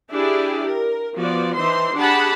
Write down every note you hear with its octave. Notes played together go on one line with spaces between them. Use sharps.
D4 E4 G4 G#4 D5
A#4
F3 B3 F#4 D5
E3 D#4 C5 C6
D4 G4 G#4 F#5 A5 B5